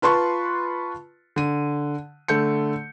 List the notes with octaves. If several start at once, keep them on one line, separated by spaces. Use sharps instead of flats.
F4 B4 A5 C6 C#6
D3 D#7
D3 A3 G6 C#7